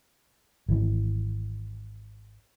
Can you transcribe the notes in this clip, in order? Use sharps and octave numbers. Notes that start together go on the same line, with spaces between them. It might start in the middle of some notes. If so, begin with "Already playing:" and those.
G#1 E3